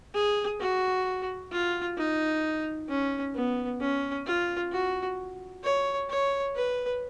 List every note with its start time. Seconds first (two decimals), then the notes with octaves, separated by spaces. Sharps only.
0.14 G#4
0.60 F#4
1.52 F4
1.97 D#4
2.88 C#4
3.35 B3
3.81 C#4
4.26 F4
4.72 F#4
5.64 C#5
6.10 C#5
6.56 B4